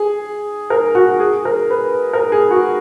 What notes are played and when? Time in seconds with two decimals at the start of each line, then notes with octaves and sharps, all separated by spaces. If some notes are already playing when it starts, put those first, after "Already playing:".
Already playing: G#4
0.70 A#4
0.95 F#4
1.20 G#4
1.45 A#4
1.70 B4
2.13 A#4
2.32 G#4
2.51 F#4